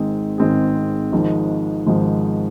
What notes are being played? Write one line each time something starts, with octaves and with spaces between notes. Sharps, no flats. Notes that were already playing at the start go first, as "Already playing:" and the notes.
Already playing: G#1 G#2 G#3 C4 G#4
G#1 G#2 G#3 C4 G#4
G#1 G#2 F3 G#3
G#1 G#2 F3 G#3